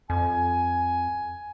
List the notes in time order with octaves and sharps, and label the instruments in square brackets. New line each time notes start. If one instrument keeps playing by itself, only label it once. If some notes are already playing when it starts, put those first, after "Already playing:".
[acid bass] F2 [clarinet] G#5